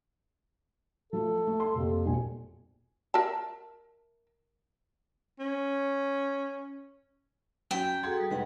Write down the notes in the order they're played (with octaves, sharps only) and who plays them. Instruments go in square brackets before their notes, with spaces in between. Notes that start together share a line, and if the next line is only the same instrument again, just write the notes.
[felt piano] F3 A3 F4 [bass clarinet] A4
[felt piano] A3
C6
[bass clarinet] F2 [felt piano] C3 A#3
[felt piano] E1 A#1 G#5
[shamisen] A#4 E5 A5
[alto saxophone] C#4
[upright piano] F#2 C#4 B6 [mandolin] G5
[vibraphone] A#5
[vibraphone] F#4 G#4 A4 [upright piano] F#5 C6 G#6
[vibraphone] G3 D#6
[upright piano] F1 G#3 [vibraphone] B4 F#5 A#5